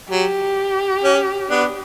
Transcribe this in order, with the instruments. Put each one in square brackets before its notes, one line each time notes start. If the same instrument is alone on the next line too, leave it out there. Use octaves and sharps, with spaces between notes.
[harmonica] F#3 [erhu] G4
[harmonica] C#4
B3 D4